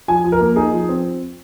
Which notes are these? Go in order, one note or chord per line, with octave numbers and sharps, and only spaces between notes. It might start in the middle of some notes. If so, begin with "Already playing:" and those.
F3 G#5
F3
A#4
A#3
D#4 G#4
F3
C4